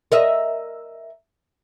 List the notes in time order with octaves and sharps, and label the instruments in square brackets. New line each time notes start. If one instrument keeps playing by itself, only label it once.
[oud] A#4 D#5 E5